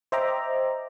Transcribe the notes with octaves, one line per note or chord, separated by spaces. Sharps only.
C5 D#5 E5 G5 A#5 D6